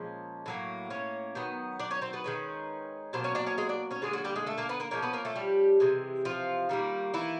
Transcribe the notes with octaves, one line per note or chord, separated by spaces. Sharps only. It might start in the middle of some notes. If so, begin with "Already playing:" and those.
Already playing: A#2 F3 G#3 C#4
A2 F#3 A#3
C#4 C#5
D#3 F#3 B3
D4 D5
C#4 C#5
C4 C5
B3 B4
D#3 G#3 C#4
B2 F#3 A#3 C5
C#4 C#5
D4 D5
C#4 C#5
G#3 G#4
D4 D5
C#4 C#5
D3 F#3 G#3 A#3 G#4
F#3 F#4
G3 G4
G#3 G#4
A3 A4
A#3 A#4
B3 B4
A#3 A#4
F3 G#3 A#3 C#4 A#4
B3 B4
A#3 A#4
A3 A4
G3 G4
C3 E3 G#3
F3 F4
D#3 G3 A#3
E3 E4